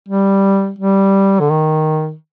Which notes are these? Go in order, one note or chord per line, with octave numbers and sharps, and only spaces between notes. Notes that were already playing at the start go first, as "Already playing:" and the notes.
G3
G3
D3
D#3